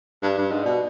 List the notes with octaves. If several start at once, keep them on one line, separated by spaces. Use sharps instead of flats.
G2 D5
G2
G#2 D#5
B2 D5